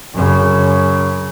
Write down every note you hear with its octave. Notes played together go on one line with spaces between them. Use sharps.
F#2 C#3